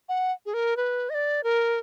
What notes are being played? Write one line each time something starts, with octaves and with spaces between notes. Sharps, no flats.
F#5
G#4
A#4
B4
D#5
D5
A#4